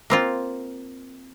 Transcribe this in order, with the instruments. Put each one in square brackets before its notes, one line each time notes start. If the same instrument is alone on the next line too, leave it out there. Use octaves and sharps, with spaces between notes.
[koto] A#3 C4 F4